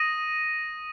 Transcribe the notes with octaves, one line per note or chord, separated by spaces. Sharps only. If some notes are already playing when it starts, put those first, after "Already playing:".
Already playing: D#6 A#6 D#7